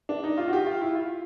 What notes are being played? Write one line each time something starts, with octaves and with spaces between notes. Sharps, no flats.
D4
D#4
F4
F#4
G4
F4
E4
F4